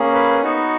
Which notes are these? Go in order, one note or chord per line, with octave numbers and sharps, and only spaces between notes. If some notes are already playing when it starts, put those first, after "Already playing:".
Already playing: A#3 C#4 G#4
B4
B3 D#4 F#4